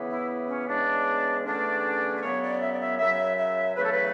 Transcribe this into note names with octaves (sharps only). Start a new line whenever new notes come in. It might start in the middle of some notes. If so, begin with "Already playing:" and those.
Already playing: C#3 E3 B3
E4
C#4
E2 C#3 G#3 B3 D4
E2 D3 A3 C#4 D4
B4
F#2 C#3 F#3 B3 C#5
D5
E5
D5
E5
F#2 C#3 F#3 E5
E5
E2 C#3 F#3 A3 B4
A4
B4